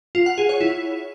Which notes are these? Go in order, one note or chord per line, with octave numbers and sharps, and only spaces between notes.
F4
F#5
G#4
C#5
E4